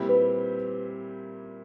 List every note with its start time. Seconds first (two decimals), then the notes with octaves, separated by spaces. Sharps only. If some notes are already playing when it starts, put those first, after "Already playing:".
Already playing: A#2 G3 C4 E4 G4
0.09 B4